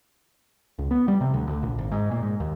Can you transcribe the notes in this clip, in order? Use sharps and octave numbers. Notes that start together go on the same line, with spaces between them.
C#2
B3
G3
C3
D2
D2
A#1
G#1
G#2
A#2
G#2
D#2